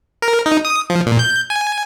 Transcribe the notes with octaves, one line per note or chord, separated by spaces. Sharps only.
A#4
D#4
D#6
F3
A#2
G6
G#5